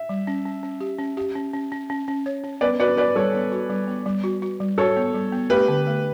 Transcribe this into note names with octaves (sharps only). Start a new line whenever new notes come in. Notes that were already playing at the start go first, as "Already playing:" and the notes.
Already playing: E5
G3
C#4
C#4
C#4
G4
C#4
G4
C#4
C#4
C#4
C#4
C#4
C#5
C#4
B3 B4 D5
F#4 B4 D5
F#4 B4 D5
G3 A4 C#5
B3
F#4
G3
B3
G3
F#4
F#4
G3
F#4 A4 C#5
B3
G3
B3
A3 G4 B4
D3
A3